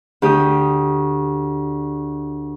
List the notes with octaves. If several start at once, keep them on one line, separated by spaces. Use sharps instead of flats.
D2 G4 D#6